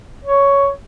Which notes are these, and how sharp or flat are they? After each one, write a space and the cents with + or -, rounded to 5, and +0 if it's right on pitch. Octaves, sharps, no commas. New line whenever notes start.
C#5 +5